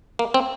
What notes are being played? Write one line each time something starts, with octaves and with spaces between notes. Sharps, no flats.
A#3
C4